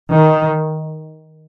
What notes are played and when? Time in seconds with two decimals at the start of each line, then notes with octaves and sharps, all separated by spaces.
0.12 D#3